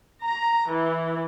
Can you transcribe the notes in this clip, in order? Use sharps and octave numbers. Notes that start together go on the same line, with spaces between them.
A#5
E3